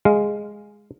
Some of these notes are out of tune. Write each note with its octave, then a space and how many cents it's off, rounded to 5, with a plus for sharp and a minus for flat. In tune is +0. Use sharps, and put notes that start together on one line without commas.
G#3 +0 F5 +0